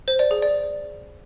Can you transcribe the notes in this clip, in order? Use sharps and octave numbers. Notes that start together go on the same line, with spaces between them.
C5
D5
G#4
D5